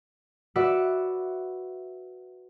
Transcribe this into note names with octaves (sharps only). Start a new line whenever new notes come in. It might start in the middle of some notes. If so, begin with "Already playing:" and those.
F#4 B4 D5 E5 F#5